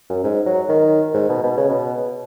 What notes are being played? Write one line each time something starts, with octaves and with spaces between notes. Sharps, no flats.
F#2
G#2
F#3
D#3
G#2
B2
B2
C#3
B2